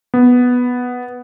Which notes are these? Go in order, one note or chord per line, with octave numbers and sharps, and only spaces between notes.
B3